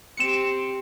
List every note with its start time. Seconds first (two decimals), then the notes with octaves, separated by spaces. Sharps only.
0.17 C4 G4 C#7 E7